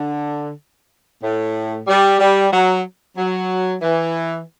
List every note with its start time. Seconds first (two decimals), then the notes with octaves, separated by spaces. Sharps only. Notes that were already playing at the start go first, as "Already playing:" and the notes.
Already playing: D3
1.23 A2
1.87 G3
2.19 G3
2.52 F#3
3.17 F#3
3.82 E3